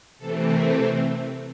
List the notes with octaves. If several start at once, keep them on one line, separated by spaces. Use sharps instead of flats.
C3 E3 A3 C4 A4
A#4